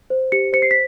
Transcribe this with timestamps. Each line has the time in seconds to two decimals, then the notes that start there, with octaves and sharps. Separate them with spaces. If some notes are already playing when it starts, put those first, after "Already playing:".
0.10 C5
0.32 G4 C#7
0.53 C5 C#7
0.62 C7
0.71 B6